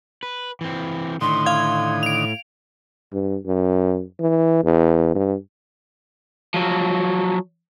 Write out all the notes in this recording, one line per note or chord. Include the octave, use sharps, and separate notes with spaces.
B4
E3 C4
A2 D3 D#3 C6 D#6
F5 G#6
D7 F7
G2
F#2
E3
E2
G2
F3 F#3